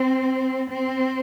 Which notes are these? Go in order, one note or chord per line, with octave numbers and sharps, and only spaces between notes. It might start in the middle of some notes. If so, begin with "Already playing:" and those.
Already playing: C4
C4